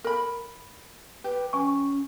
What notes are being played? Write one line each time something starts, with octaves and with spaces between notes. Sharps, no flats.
A#4 B5
G4 B4
C#4 G#5 C#6